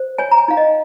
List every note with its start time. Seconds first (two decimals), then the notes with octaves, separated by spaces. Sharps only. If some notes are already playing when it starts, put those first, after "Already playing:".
Already playing: C5
0.18 C#5 G#5
0.31 A#5
0.38 G#5
0.48 D#4 F5
0.57 D#5